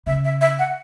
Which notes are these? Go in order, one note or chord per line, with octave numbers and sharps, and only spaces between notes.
C#3 E5
E5
E5
F#5